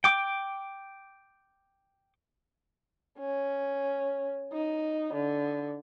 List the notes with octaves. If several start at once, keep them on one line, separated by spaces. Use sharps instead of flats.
G5 D6
C#4
D#4
D3